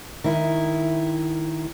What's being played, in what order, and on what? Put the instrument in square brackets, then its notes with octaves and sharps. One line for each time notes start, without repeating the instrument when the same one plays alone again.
[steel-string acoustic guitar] D#3 E4